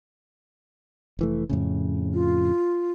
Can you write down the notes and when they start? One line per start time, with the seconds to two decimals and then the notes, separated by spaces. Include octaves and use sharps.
1.19 F1 E3 A3
1.49 F2 A2 C#3
2.14 F4